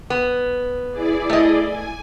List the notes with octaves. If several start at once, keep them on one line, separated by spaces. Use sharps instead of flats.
B3
E4 G#4 D5
A3 D#5
G#5